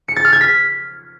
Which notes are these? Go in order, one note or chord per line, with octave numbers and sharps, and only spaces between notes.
C#7
A6
F6
G#6
B6